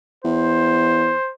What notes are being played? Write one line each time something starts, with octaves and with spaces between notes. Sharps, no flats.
E2 C5